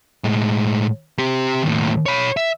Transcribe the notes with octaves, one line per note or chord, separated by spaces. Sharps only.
A2 G#3
C4 G4
D#2 A2
C#5 B5
E5